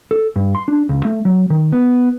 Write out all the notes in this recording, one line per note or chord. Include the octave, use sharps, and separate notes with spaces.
A4
G2
C6
D4
C#2
A3
F#3
D#3
B3